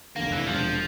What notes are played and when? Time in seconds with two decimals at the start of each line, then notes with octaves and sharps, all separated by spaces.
0.16 F1 E2 D3 A#3
0.32 E3
0.47 E1 E2 C3 F3 G3 D4